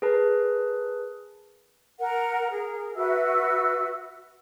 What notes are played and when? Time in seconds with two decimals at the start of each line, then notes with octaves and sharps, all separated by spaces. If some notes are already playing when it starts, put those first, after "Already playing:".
0.02 G#4 A#4 B4 A5
2.00 A#4 F#5
2.51 G#4 A#4
2.95 F#4 B4 E5 E6